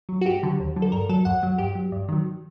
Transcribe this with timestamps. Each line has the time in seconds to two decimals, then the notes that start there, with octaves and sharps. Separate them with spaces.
0.09 F#3
0.21 F#4
0.25 G2 G4
0.43 D3 F#3
0.60 D#2
0.76 D3 F#3
0.82 A4
0.92 G2 A#4
1.09 F#3 A4
1.25 F#2 F#5
1.43 F#3
1.58 G2 G4
1.75 F#3
1.92 G2
2.09 D#3 F#3